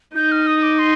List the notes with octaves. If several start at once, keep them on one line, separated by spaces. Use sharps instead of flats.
D#4 G6
F6
D#6
D6
C6